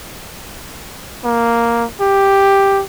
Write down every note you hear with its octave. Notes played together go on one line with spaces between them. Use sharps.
A#3
G4